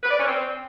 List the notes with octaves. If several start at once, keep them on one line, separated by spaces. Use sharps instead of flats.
B4
D5
C#4
C4